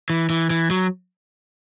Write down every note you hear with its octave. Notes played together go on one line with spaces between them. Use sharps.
E3
E3
E3
F#3